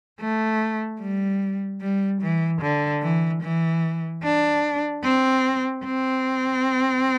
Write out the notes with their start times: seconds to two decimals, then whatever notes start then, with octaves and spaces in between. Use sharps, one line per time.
0.20 A3
1.00 G3
1.82 G3
2.22 E3
2.62 D3
3.03 E3
3.42 E3
4.23 D4
5.04 C4
5.84 C4